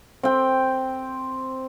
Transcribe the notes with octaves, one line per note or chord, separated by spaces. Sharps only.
C4 G5